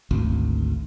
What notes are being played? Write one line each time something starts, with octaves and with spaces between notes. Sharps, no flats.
G#1 D2